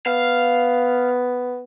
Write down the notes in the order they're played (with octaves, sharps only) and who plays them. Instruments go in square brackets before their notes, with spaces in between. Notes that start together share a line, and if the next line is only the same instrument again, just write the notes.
[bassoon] B3 [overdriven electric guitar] F5